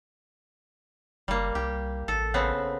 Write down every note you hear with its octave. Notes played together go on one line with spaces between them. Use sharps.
F#1 G3 A#3
C2 G4
A1 A4
C#3 B3 C4